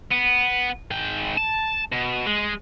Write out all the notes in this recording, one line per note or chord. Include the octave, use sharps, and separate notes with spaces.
B3
G#2 G5
A5
B2
G#3